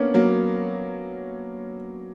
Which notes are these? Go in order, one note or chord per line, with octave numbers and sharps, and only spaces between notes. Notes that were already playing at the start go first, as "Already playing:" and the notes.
Already playing: A#3 B3 C#4 D4
F#3 A#3